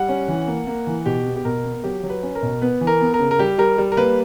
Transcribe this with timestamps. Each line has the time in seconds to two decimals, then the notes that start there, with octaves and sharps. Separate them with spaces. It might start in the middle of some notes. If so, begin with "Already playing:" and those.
Already playing: G3 F#5
0.09 C#4
0.28 E3
0.47 A#3
0.67 A#3
0.87 E3
1.06 B2 G4
1.26 B3
1.36 G4
1.45 B2 A#4
1.64 B3
1.84 F#3 G4
2.03 F#3
2.10 B4
2.23 C#4
2.35 A#4
2.42 B2
2.62 B3 B4
2.81 E3
2.87 A#4
3.01 B3
3.14 A#4
3.20 C#3
3.31 A#4
3.39 G3 G4
3.58 G3 A#4
3.78 G3
3.92 A#4
3.97 A#3 B4